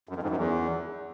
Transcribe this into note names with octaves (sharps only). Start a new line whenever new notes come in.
F#2
F2
G#2
F#2
E2